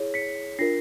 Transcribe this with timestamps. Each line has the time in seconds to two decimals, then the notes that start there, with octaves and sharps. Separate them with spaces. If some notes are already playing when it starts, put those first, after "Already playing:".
Already playing: E4 G#4 C#5
0.14 B6 C#7
0.59 D4 F4 A#4 A#6 C7